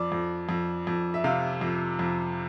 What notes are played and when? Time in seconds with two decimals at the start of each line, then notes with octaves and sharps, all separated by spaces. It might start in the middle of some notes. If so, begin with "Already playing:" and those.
Already playing: F2 D5
0.12 F2
0.49 F2
0.87 F2
1.14 E5
1.24 C3 F5
1.61 F2
1.99 F2